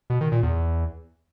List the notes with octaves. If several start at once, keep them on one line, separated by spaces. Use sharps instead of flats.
B2
D#3
A#2
E2